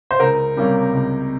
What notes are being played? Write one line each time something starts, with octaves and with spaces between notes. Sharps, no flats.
C5
C#2 A#4
C3 G3 A#3 C#4
C#2